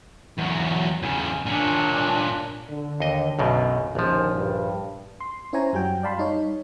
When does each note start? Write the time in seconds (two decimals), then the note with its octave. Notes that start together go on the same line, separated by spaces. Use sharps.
0.38 E2 F#3
1.03 E2 C#3
1.46 A#2 C#4 D4
2.69 D3
3.00 D#2 D#5
3.39 B1 F#2 B2
3.95 A#1 D#2 D3 F3 C#4
4.35 G2
5.20 C6
5.53 C#4 E4 C5 C#5 G#5 A#5
5.73 F#2 G3 F#4 G5
6.03 D5 F5 A5 B5 C6
6.18 G3 D#4 C#5